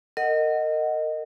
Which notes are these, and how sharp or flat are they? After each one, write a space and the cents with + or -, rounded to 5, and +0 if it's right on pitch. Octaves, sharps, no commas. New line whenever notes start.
A#4 -30 D#5 +0 F#5 +0